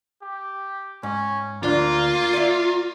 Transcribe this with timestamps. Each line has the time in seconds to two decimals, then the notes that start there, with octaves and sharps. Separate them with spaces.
0.22 G4
1.03 G#2 C#4
1.63 D2 A#3 D4 F4
2.34 D5 E5